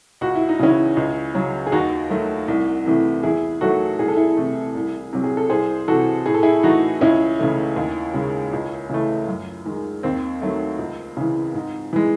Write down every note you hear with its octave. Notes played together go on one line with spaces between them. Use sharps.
C#2 F#4
E4
D#4
C#3 E3 C#4 E4
C#2
C#3 F#3
G#4
D#2 D#4 F#4
D#3 F#3 A3
C2
C3 E3 A3
E2 E4 G#4
D#3 F#3 A3 F#4 A4
C2 G#4
A4
E4 G#4
C3 E3 A3
C2
C3 F#3
G#4
A4
C2 G#4 C5
C3 E3 F#4 A4
A2 G#4
A4
E4 G#4
E3 A3 D#4 F#4
C#2 C#4 E4
C#3 E3 A3
D#2
C#3 G#3
C#2
C#3 E3 A3
F#2
D#3 G#3
D#2 C4
D#3 F#3 A3
C#2
C#3 E3
G#2
E3 G#3